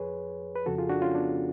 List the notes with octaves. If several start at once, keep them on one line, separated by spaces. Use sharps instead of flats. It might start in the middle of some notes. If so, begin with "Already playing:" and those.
Already playing: F2 F3 G#4 B4 C#5
B4
F2 C#3 F3 F#4 A4
F4 G#4
D4 F#4
C#4 F4
B3 D4